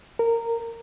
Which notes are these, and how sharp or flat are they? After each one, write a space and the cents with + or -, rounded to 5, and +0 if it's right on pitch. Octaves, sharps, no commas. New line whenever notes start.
A#4 -15